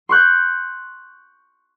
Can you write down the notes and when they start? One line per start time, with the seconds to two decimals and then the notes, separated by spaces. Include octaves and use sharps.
0.09 C6 C#6 F#6 G6